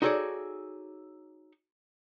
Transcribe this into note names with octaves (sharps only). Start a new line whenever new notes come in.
D#4 F#4 G#4 A4 C#5 D5